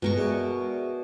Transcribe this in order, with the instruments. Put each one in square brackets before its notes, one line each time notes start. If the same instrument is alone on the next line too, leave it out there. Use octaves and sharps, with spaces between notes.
[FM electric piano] G2 G#3 [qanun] B2 A#4 C#6
[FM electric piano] G#4 D5 E5